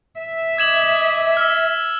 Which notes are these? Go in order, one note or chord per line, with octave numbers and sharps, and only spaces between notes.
E5
D#5 D6 D#6 G#6 E7 F#7
E6 F6